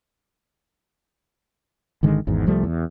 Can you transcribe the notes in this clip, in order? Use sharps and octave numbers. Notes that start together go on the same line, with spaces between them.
G#1 D3 D#3 G#3
G#1 E2 G#2
C2 F3 G3 A3
E2